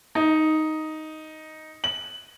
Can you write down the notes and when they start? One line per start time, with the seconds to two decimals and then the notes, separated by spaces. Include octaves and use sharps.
0.15 D#4
1.84 F#7